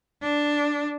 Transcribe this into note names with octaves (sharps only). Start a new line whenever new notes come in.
D4